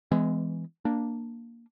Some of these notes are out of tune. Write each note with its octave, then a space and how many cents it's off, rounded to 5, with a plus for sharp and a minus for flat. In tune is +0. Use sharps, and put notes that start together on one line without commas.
E3 +10 G#3 +0 B3 +40
A#3 +0 D4 +0